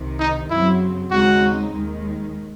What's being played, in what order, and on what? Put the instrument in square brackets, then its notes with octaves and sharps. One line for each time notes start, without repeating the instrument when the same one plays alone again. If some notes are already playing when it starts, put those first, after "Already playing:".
Already playing: [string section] C2 C3 D#3
[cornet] D#4
[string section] F#2 C#3 F#3 C4 [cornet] E4
[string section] D#2 C#3 G#3 C4 D#4 [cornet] F#4
[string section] D#2 D#3 G#3